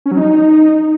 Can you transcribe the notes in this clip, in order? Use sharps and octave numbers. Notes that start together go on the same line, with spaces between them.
C#4
F#3
D#4